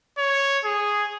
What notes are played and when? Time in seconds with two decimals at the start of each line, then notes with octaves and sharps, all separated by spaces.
0.18 C#5
0.65 G#4